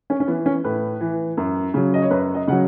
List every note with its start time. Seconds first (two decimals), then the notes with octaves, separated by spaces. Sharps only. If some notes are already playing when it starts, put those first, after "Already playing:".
0.10 C#4
0.20 C#4
0.27 E3 B3
0.46 C#4
0.64 A2 B4
1.01 E3
1.37 F#2
1.74 C#3 F#3
1.94 D#5
2.02 C#5
2.11 F#2 B4
2.35 D#5
2.47 C#3 F#3 F#5